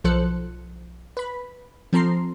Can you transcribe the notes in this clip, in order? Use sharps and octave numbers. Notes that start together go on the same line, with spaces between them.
B1 F3 A4 C5 F#6 C#7
B4 B5
F3 C4 A4 A#5 C6 C7